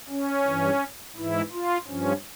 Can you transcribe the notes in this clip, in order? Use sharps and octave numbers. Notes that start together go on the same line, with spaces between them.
C#4
G2 E3
G#2 E3 E4
F4
G2 F3 C#4